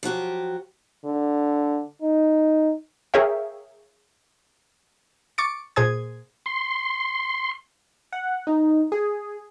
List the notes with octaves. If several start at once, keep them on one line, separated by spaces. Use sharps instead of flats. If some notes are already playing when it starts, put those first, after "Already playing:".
F3 F#3 F#4 G4
D3
D#4
G#4 A#4 C#5 E5 F5 G5
C#6 D6 A6 C#7
A#2 G#4 C5 G#5 D#6 G#6
C6
F#5
D#4
G#4